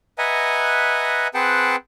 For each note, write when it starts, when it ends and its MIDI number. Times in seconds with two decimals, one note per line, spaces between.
0.18 1.27 71
0.18 1.27 75
0.18 1.27 76
0.18 1.27 78
0.18 1.27 80
0.18 1.27 82
1.34 1.76 60
1.34 1.76 68
1.34 1.76 71
1.34 1.76 78
1.34 1.76 79
1.34 1.76 81